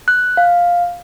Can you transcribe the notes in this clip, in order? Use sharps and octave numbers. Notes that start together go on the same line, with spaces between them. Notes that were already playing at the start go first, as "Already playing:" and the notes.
F#6
F5